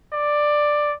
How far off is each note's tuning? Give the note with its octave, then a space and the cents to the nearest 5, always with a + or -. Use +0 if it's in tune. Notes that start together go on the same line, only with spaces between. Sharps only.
D5 +10